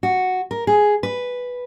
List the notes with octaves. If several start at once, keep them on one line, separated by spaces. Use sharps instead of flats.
F#4
A#4
G#4
B4